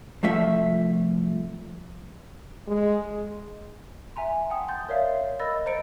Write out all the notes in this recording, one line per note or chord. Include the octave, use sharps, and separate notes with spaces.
C2 F3 A3 E5
G#3
E5 G#5 A#5 C6
F#5 G5 A5 D#6
C6 G6 A6
A#4 C#5 D5 E5 F5
A#4 D#5 B5 E6 A6 A#6
C5 A#5 A6 C#7 D7